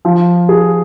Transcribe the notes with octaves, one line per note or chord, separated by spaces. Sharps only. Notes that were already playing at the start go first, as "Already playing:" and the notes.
F3
G#4